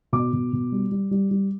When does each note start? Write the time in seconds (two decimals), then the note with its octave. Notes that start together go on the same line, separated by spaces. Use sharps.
0.12 B2 D6
0.33 B2
0.53 B2
0.72 G3
0.91 G3
1.11 G3
1.31 G3